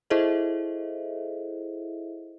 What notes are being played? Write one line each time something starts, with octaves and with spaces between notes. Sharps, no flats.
E4 G#4 A4 C5 D#5 E5